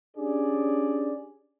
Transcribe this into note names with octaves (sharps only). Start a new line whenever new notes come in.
C#4 D4 G4 G#4 D5